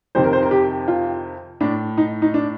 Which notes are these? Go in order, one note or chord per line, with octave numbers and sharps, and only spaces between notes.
F2 C3 D#3 C5
A#4
C5
A#4
G4
F4
A2 D4
D#4
D#4
D4